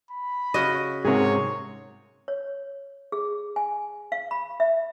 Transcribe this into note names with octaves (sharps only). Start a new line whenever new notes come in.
B5
C#3 F#4 D#5
G#2 C3 G#4 A#4 C#5 F#5
C#5
G#4
G#5
F5
B5
E5